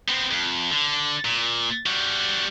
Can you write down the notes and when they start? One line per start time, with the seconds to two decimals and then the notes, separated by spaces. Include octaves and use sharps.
0.08 B3 C4
0.31 F2
0.71 D3
1.25 A#2
1.86 G3 F#4